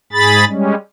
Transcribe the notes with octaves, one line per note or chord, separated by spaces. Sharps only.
G#2 G#4 B5 A6
G3 G#3 C#4